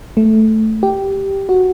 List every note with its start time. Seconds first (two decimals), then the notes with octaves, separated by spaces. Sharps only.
0.17 A3
0.83 G4
1.49 F#4